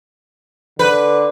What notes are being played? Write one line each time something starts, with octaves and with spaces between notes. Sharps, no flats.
D3 B4